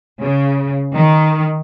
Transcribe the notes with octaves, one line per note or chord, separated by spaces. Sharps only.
C#3
D#3